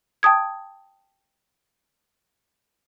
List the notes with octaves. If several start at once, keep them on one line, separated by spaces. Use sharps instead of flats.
G5 A5 D#6 G#6